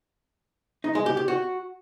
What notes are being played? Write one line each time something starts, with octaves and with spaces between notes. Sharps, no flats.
D#4
G#3
G4
G4
F#4